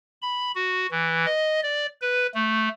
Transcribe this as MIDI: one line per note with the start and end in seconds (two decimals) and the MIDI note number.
0.22 0.51 83
0.55 0.87 66
0.92 1.26 52
1.26 1.60 75
1.63 1.86 74
2.01 2.27 71
2.34 2.69 57